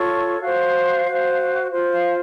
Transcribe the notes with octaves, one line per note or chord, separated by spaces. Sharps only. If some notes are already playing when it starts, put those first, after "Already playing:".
Already playing: F4 A4 C#5 C#6
F#4 C5 F5
F#4 C5
F4 C5
F5